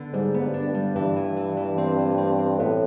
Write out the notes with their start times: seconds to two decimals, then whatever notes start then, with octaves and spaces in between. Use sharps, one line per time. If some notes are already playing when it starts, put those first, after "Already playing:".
Already playing: D3 B3
0.13 G#2 G3
0.34 B3
0.40 G2
0.54 D4
0.68 G2
0.75 G3
0.95 G2 E3
1.16 E3
1.37 E3
1.57 E3
1.78 C4
1.98 E3
2.18 C4
2.39 C4
2.59 A2 B3